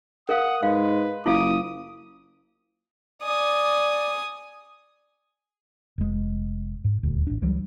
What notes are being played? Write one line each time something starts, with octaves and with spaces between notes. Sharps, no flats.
A#4 F5 F#5 D#6
G#2 G#3 B4 F5
F#1 E4 F4 F5 D6 D#6
D5 G#5 D#6
F1 G#3
G#2
D#1 D2
A1 D4
C#2 E3 F#3 G3